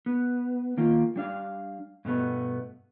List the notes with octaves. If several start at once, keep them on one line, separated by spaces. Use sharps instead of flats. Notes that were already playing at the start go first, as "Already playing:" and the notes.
B3
D#3 A#3 F4
G3 D4 F5
G2 B2 A3 B3